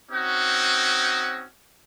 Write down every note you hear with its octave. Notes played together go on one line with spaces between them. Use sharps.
C4 C#4 D#4 F#4